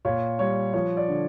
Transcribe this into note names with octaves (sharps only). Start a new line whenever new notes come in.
A#2 C#5
G3 C#5
F3 C#5
D5
D3